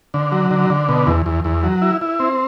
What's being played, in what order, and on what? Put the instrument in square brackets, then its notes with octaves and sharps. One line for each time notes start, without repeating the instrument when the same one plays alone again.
[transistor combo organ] D3
F#3
D3
D3
B2
E2
E2
E2
F#3
E4
E4
C4